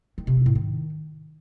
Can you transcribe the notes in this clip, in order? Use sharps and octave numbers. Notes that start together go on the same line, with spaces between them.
D#3
C3
C4
A2
D#3